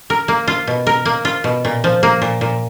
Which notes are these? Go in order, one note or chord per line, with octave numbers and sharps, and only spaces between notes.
A#4
A#3
F4
B2
A#4
A#3
F4
B2
A#2
F3
A#3
A#2
A#2